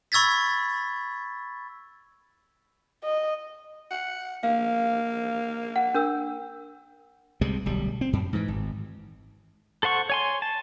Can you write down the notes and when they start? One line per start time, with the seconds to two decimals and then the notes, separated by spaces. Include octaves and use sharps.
0.12 B5 C#6 E6 G#6 A6 B6
3.04 D#5
3.91 F#5
4.43 A#3 F5
5.76 F#5
5.94 D4 A#4 E6
7.41 C2 C3 G3 G#3
7.65 D1 B1 G3
8.01 C4
8.13 F#2
8.33 G#2 E3
8.48 G#1
9.83 A4 C5 F#5 C#6
10.10 C#5 G#5 C6
10.42 A5